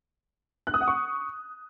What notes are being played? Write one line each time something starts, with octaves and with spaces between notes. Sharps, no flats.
F#6
D#6
F#5
C#6